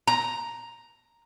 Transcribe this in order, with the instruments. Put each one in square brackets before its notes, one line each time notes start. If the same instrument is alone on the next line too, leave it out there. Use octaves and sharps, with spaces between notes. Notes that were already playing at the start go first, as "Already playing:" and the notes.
[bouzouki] A#5